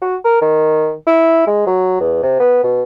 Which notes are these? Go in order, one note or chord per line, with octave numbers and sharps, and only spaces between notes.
F#4
A#4
D#3
E4
G#3
F#3
E2
C3
B3
B2